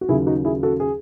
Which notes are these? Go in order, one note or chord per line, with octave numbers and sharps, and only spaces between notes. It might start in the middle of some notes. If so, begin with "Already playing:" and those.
F#4
D#2 C#3 F#3 E4 G#4
D#4 F#4
E4 G#4
F#4 A4
G#4